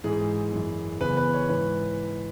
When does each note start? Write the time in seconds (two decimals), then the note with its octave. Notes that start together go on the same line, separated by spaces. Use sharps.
0.04 G#2 E3 G#4
0.53 F#2 E3
1.01 E2 C#3 E3 B4
1.17 B4
1.33 C#5
1.49 G#2 E3 B4